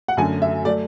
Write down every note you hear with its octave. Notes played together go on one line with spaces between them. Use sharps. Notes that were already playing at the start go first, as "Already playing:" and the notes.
F#5
F#2 D3 F#3 A3 G#5
E5
F#3 A3 D5